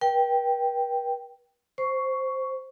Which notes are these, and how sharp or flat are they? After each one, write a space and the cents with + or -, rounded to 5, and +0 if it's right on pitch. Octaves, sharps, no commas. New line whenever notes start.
B4 -45 G5 +0
C5 +0 C#6 +10